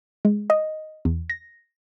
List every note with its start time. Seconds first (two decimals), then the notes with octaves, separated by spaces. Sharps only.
0.25 G#3
0.50 D#5
1.05 E2
1.30 A#6